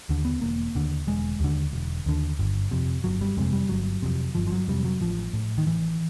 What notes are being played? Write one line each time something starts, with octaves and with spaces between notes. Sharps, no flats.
D#2 D3
B3
E1 A#3
D#2 D3
E1 G#3
D#2 D3
E1
D#2 D3
G1
F2 C3
G1 F#3
G3
F2 C3 G#3
G3
G1 F#3
F2 C3
G1 F3
F3
F#3
F2 C3 G3
F#3
A1 F3
A2
D#3
A1 E3